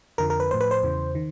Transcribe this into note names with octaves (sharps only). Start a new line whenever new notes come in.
F2 D3 F3 A#4
A#4
B4
A2 F3 C5
B4
C5
E2 C#3 E3
D#3